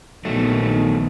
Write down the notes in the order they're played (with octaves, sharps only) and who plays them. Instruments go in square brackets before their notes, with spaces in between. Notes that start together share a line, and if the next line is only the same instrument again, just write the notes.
[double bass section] A#1 D#3 B3 [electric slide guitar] F#3 A3